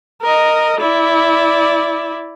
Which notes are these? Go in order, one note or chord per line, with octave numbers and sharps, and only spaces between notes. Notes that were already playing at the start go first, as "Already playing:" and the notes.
A#4 D#5
E4 D5